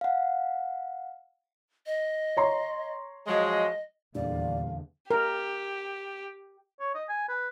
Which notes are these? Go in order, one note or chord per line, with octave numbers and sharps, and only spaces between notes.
F5 F#5
D#5
C#5 A#5 C6
F3 F#3 G#3 D#5
D#1 E2 D3 D5 F5
G4 A#4
C#5
D#5
G#5
B4